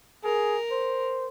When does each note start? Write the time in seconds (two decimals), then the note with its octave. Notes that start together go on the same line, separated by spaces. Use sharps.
0.24 G#4 A#4
0.72 C5